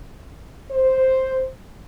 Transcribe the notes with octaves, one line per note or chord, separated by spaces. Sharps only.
C5